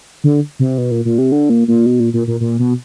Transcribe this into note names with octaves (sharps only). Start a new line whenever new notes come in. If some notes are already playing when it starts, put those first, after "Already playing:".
D3
C3
B2
A#2
A#2
C3
D3
A#2
A#2
B2
A#2
A#2
A#2
A#2
B2